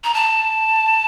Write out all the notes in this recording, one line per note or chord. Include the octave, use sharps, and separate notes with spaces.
A#5
A5